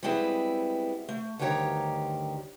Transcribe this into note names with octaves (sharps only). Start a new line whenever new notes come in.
G3 G#3 B3 C4 E4 G#4
A3
D2 G2 D#3 G4 C#5 A#5